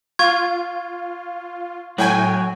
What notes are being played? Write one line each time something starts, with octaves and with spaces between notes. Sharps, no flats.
F4 C#6 G#6
A2 F#3 F#4 G5 G#5